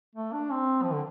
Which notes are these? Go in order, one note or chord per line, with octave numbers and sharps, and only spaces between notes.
A3
D4
C4
F3
D3